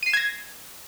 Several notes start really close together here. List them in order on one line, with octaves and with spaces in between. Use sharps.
D#7 C7 E7 G#6 A#6